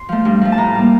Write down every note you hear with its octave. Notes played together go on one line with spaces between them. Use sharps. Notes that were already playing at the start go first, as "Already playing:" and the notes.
Already playing: C6
F3 A3
G2
F3 A3
A5
A2 A#5
G3 A#3